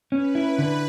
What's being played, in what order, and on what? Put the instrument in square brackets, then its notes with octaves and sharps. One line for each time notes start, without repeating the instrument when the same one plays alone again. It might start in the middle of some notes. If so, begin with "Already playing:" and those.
[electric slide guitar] C#4 [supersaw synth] B4
[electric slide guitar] E4
D3